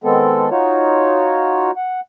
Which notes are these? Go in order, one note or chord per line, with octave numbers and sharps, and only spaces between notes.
D#3 G#3 B3 C4 A4
D#4 F4 F#4 C#5
F#5